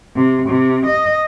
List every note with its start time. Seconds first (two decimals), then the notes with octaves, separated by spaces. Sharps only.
0.16 C3
0.49 C3
0.86 D#5